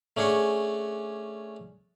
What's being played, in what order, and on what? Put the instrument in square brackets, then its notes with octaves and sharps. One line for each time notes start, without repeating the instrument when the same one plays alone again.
[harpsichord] A3 C#4 D4 G#4 F#5